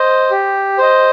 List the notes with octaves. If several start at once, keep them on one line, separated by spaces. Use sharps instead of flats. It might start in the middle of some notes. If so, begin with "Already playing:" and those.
Already playing: C5 D#5
G4
C5 D#5